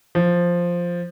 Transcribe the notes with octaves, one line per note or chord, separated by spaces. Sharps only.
F3